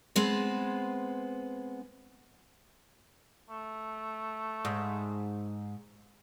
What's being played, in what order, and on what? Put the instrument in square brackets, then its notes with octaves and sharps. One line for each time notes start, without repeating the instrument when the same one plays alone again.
[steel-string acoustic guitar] G#3 B3 C4 B4
[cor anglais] A3
[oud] G#2